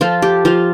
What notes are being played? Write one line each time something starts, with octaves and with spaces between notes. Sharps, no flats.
F3 F4 A4
G4
F3 F4